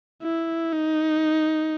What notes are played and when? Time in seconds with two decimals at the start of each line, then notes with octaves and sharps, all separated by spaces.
0.22 E4
0.72 D#4